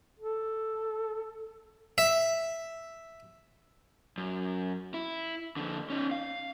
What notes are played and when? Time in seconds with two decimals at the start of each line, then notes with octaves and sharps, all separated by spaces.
0.20 A4
1.98 E5
4.18 F#2
4.94 E4
5.56 F2 D3
5.90 C#4 D#4
6.11 F5